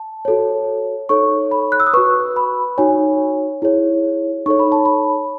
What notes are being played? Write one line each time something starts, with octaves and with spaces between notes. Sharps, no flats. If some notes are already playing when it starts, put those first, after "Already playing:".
Already playing: A5
F#4 A4 C#5
D#4 A4 C#5 C#6
B5
F#6
E6
D#6
F#4 B4 C#6
B5
D#4 F#4 C#5 G#5
E4 G#4 C#5
D#4 A4 C#5 C#6
B5
A5
B5